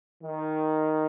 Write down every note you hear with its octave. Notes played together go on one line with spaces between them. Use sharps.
D#3